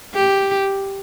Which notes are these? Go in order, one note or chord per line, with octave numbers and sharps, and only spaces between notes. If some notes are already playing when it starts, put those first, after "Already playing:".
G4